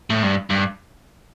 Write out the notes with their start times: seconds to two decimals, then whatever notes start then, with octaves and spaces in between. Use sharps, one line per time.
0.10 A2
0.23 G2
0.50 G2